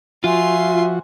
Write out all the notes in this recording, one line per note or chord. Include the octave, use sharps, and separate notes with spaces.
F3 F4 F#4 E5 G#5 C6